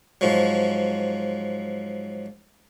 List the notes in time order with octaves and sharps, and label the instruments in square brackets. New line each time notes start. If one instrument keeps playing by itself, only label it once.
[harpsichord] G#2 F3 F#3